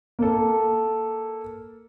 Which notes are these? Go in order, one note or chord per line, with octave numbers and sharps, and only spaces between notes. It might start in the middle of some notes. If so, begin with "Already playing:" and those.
A#3 A4